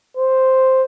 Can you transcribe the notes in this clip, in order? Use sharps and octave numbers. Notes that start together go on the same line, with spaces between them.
C5